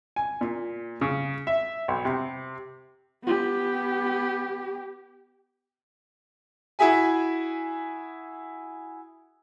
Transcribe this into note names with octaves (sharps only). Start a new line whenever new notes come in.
G#5
A#2
C#3
E5
B1
C3
B3 G4
E4 F#4 G#4 E5 G#5